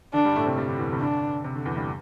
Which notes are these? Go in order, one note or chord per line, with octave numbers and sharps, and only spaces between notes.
D3 D4
G2 G3
A2 A3
C3 C4
G2 G3
D3
E2 E3
C3
D3 D4
C3
D3
E2 E3
G2 G3